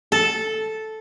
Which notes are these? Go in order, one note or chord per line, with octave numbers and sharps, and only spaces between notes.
A4